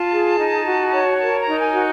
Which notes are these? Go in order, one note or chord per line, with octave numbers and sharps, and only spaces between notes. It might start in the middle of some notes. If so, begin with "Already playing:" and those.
Already playing: F4 A5
G#4
D#4
F#4
C#5
A#4 A5
A#5
D#4
G#5
F#4